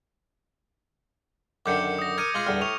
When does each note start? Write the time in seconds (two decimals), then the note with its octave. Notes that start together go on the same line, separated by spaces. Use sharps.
1.66 F#2 D3 D#3 D6 G6 C#7
1.99 D#6 A#6
2.18 A#4 G#6 C#7 D#7
2.34 G#3 F4 G#4
2.47 E2 G2 D3 F6
2.61 A2 C#6 C#7 F7